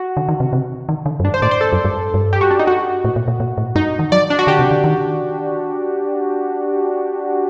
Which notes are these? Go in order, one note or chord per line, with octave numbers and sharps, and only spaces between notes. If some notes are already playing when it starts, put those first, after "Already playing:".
Already playing: F#4
D3
D#3
C3
C3
D#3
D3
F#2
G2 D4
C5
A2 D5
C5
A4
F#2
G2
G2
G4
F#4
D4
D#4
F#4
A2
A#2
A#2
A#2
A2
G2 D#4
D#3
F#3 D5
D4
F#4
D3 G4
C3
D3
D#3